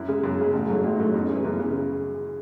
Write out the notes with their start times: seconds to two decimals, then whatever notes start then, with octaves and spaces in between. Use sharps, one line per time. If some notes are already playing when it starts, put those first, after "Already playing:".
Already playing: F#2 E4
0.08 C#3 G#3
0.24 F#2
0.39 C#3 G#3
0.53 A1
0.68 G#2 F#3 A3
0.83 A1 E4
0.94 D#4
0.99 G#2 F#3 A3
1.14 F#2 D#4
1.29 C#3 E3
1.45 F#2
1.59 C#3 E3